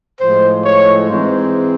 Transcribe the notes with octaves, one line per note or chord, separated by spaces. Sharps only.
A2 F3 G#3 C5
C#5
G#2 E3 G#3 C4 C5